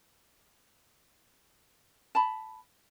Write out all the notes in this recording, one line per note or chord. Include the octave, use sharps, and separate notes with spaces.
A5 B5